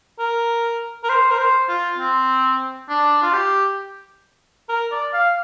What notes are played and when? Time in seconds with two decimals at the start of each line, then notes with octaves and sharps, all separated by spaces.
0.19 A#4
1.03 A#4
1.09 C5
1.31 A#4
1.38 C5
1.68 F4
1.98 C4
2.89 D4
3.22 F4
3.33 G4
4.69 A#4
4.91 D5
5.13 F5